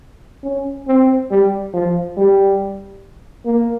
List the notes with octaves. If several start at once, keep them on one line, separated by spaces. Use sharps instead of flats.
C#4
C4
G3
F3
G3
A#3